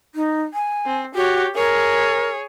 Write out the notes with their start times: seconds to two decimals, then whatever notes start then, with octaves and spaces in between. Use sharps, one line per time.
0.15 D#4
0.54 G#5
0.86 C4
1.15 F#4 G4 C#5
1.55 G#4 A#4 C#5